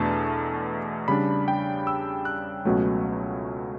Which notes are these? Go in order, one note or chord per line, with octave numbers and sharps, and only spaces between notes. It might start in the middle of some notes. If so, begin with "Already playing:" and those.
Already playing: E2 B2 A3 D4 A5
C#3 G3 D4 B5
G5
E6
F#6
C#2 B2 F#3 A3 C#4